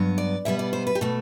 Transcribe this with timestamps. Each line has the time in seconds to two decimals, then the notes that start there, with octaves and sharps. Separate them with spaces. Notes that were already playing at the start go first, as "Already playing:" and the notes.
Already playing: G2 F#3 B3
0.18 D5
0.45 B2 G3 B3 E5
0.59 D5
0.73 C5
0.87 B4
0.95 G4
1.01 B2 A3 A4